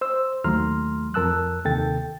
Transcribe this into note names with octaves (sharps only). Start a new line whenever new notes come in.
C5 E6
D#2 F#3 A3 A#5 C6 F6
F2 A#4 A5 E6 F#6
D#2 C3 A4 G5 A6